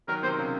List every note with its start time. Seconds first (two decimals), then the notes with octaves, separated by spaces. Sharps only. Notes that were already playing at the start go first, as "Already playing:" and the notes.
0.08 D#3 F#3 A#4
0.23 C3 D#3 C5
0.38 C#3